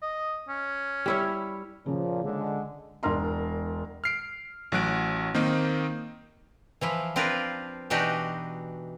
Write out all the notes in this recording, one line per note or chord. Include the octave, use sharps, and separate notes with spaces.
D#5
C#4
G3 E4 C#5
A#2 C#3 F3 C#4
D3 G#3
E1 D4 A#4 C6
F6 C7 D7
A1 F#3 F#4 F#6 D7
D#3 A#3 C4 D#4
E3 F3 E4
C4 D4 F4 A#4 B4
B2 E3 D4 D#4 F#4 G4